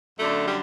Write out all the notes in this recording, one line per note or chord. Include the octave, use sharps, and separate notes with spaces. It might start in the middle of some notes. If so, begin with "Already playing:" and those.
F#2 D3 A3
G3